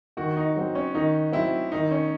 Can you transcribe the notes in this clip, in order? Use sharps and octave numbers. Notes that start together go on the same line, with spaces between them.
D#3 F#4
D#4
F#3 C4
C#4
D#3 D#4
F#3 C4 E4
D#3 D#4
C#4